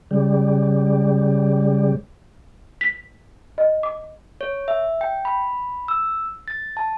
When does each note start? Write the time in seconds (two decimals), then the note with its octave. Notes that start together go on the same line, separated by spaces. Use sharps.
0.11 C#3 G3
2.81 B6
3.58 D#5
3.83 D6
4.41 C#5
4.68 E5
5.01 G5
5.25 B5
5.88 E6
6.48 A6
6.77 A5